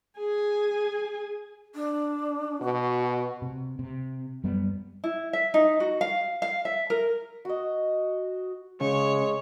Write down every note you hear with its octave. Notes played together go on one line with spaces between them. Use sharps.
G#4 G#5
D4
B2 F#4
C3
C3
F#2 G3 B3
E4
E5
D#4
F#4
F5
F5
E5
A#4
F#4 D#5
C#3 G#3 C#5